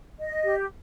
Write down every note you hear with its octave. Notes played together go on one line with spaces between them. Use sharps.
D#5
G4